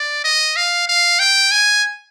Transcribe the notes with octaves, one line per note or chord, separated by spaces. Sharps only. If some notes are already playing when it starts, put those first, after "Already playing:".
Already playing: D5
D#5
F5
F5
G5
G#5